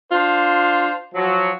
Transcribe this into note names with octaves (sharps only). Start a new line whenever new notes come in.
D4 F4 C5
F3 F#3